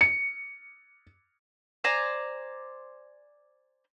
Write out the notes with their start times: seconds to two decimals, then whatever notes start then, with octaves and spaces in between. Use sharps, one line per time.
0.01 C#7
1.84 C5 D5 G#5 A#5